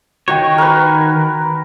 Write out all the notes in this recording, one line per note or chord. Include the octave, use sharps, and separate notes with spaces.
D#3 D#4 F#4 C#5 G5
A#4 B4